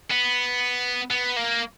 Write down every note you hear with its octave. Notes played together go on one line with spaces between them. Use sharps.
B3
B3
A#3